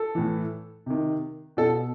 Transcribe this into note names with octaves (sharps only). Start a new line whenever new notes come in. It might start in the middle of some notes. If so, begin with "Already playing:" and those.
Already playing: A4
A2 E3
C3 D#3
B2 A4